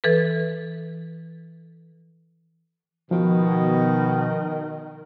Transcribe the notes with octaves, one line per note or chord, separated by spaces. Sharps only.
E3 A4 B4
B2 D#3 F3